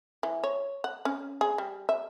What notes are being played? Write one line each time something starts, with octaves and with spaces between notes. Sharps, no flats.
E3
C#5
F#5
C#4
G#4
G3
E5